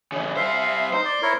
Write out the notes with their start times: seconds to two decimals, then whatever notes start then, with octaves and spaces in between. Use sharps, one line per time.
0.12 C#3 E3
0.36 G3 C5 E5 F5
0.93 D#4 C5
1.05 D5
1.22 E4 A#4 C#5